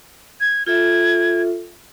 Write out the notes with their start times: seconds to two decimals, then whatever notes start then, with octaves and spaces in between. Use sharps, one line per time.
0.41 G#6
0.67 F4 A4 E5 G#6